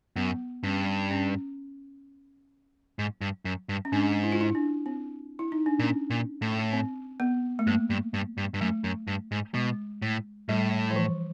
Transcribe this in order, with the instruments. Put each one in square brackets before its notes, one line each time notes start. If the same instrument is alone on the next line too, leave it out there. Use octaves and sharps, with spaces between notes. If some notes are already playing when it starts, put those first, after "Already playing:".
[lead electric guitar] F#2 [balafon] B3
[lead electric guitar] G2 [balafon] C#4
[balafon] C#4
[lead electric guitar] G#2
G2
F#2
G2
[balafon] C#4
[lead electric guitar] G#2 [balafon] D4
[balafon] E4
F4
E4
D4
C4
E4
D#4
D4
[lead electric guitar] A#2 [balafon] C#4
[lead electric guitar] A#2
A2
[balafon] C4
B3
A3
[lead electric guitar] G2 [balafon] A#3
[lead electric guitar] G2
G2
G2
G2
[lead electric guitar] F#2 [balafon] A3
[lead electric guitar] F#2
G2
G#2
[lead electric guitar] B2 [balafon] G#3
[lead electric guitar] A2
[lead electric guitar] A2 [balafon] G3
[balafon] F3
E3